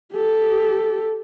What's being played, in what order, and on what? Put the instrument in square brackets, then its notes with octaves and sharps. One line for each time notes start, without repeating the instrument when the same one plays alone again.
[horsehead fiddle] G4 A4